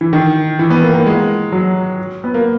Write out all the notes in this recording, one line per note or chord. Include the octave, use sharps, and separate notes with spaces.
E3
D#3
E3
B3
A#3
A#3
G#3
F#3
B3
A#3